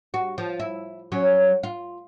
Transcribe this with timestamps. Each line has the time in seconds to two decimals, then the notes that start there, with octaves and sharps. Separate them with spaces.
0.14 F#4
0.38 F3
0.60 E4
1.12 F#3 C#4
1.63 F4